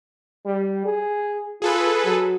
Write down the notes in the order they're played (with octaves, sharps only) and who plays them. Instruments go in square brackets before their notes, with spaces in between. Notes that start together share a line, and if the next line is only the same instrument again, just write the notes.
[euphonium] G3
G#4
[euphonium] F4 [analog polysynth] G#4 A4 B4
[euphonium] F#3